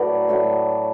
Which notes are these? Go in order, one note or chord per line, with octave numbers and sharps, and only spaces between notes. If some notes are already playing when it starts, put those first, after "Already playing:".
Already playing: A2 F#3 A3 B4 D5 E5
A2 F#3 A3